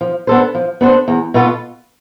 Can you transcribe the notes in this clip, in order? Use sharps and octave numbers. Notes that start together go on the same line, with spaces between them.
F3
B3 D4 A4 C5
F3
B3 D4 A4 C5
E2
B2 B3 F4 A4